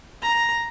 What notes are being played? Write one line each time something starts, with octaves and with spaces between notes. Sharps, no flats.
A#5